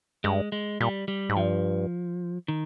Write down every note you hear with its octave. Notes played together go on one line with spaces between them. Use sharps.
G2 G#3
G#3
A#2 G3
G3
G#2
G2 F3
D#3